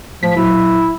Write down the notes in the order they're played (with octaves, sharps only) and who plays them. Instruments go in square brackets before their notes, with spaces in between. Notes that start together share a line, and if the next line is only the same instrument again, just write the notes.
[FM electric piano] A2 B6 [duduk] F3
[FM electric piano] A#2 F#3 [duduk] E4